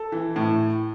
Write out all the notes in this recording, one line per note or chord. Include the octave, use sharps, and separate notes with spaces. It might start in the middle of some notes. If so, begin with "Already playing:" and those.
Already playing: A4
E3
A2